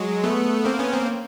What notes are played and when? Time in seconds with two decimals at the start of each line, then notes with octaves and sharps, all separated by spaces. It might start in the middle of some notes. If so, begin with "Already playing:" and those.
Already playing: F#3 G#3
0.24 A3 B3
0.65 A#3 C4
0.79 B3 C#4
0.93 A#3 C4